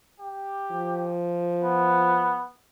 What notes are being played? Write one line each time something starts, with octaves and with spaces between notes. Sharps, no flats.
G4
F3
B3